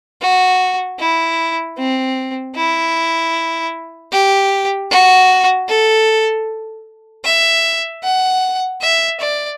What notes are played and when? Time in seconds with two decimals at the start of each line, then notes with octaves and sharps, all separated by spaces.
0.21 F#4
0.99 E4
1.78 C4
2.56 E4
4.12 G4
4.91 F#4
5.69 A4
7.25 E5
8.03 F#5
8.82 E5
9.21 D5